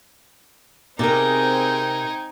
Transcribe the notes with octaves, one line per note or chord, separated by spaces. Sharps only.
C3 C4 D#4 G#4 A#4 G5 G#5